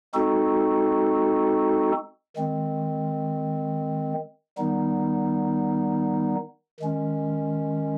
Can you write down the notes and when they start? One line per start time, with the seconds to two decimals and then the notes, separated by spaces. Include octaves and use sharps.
0.14 G#3 C4 D#4 F#4 A4
2.36 D#3 G#3 C4
4.58 D#3 G3 B3 D#4
6.80 D#3 G#3 C#4